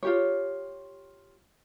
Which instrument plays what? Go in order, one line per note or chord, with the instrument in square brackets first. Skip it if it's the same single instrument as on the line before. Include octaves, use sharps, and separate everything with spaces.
[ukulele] F4 G4 C#5